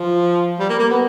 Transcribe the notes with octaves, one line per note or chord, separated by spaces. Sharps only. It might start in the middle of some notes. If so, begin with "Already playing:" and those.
Already playing: F3
G3
A#3
A#3
B3